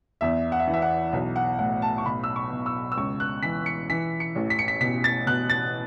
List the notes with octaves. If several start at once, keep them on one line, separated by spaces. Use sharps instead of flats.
E2 E5
F#5
E5
E3
E5
F#5
B1
F#5
A2 F#5
A5
C#6
B2 B5
E6
C#6
B2
E6
E6
C#2 C#6
F#6
E3 B6
C#7
E3 B6
C#7
A1
B6
C#7
B6
B2 B6
A6
B2 F#6
A6